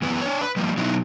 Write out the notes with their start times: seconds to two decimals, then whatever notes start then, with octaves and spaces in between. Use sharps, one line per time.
0.02 F#2 E3 B3 B4
0.21 D4 C#5
0.41 B4
0.56 F3 G3 A#3
0.77 B2 F#3 B3 D#4 E4